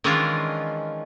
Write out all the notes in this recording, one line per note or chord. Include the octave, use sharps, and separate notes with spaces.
D#3 E3 G#3 C#4 D4 F4